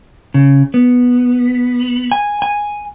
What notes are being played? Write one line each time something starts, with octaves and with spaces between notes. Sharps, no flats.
C#3
B3
G#5
G#5